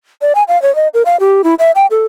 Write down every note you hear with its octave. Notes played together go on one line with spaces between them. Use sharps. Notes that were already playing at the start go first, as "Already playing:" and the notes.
D5
G#5
F5
C#5
D#5
A#4
F5
G4
E4
E5
G5
A4